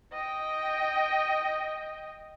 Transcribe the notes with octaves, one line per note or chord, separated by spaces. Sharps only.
D#5 G5